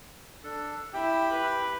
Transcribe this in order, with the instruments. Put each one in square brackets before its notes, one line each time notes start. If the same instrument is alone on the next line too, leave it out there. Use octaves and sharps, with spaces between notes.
[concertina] D4 A4
[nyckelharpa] E4 [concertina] G4 G5
[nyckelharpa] B4